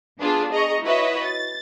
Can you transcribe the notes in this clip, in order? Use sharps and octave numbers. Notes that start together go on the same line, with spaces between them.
B3 D4 F4 G#4
G#4 D#5 A#5 C#6
E4 F#4 B4 C#5 D#5 E5
A6